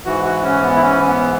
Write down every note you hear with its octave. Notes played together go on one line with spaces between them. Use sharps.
G#2 E3 F#4
F#4
C#4
B3
E4
C#4
C#4
B3